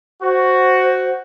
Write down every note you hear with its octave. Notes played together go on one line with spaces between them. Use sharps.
F#4 C5